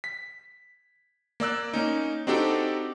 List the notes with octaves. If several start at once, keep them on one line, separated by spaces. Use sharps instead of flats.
B6
A#3 D5 E6 F#6
A#3 C#4 D#4
C4 D4 D#4 F#4 G4 A4